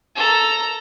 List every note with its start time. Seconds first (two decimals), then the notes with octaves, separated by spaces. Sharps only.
0.16 A4 A#5